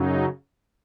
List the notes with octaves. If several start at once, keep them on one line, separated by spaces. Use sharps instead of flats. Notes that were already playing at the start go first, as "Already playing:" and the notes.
Already playing: F#2 C#3 F#3 D#4